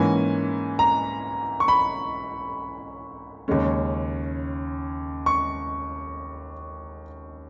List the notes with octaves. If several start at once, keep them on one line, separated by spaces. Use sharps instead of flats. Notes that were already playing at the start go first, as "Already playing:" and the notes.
Already playing: G#2 E3 A#3 C#4 G#5
A#5
C#6
B5
D#2 C#3 G#3 C#4
C#6